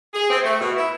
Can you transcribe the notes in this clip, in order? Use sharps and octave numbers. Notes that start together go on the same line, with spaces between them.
G#4
C4
A3
B2
E4